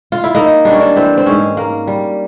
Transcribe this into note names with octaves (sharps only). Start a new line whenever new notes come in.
F4
E4
A#3 D#4
G3 D4
C#4
D4
E3 C4
C4
G#2 C#4
A#3
G3